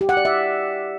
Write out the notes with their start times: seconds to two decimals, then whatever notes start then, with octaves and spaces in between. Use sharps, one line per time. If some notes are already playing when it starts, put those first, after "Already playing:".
0.01 G4
0.09 F#5
0.17 D5
0.25 E5